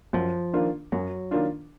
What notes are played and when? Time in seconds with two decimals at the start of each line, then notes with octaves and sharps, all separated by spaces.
0.13 F#2 F3
0.53 D#3 A#3 D4 F4
0.92 F#2 F#3
1.31 D#3 A#3 D4 F4